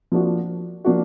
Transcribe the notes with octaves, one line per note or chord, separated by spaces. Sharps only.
F3 A#3 D4 F#4
F3 A#3 D4 F#4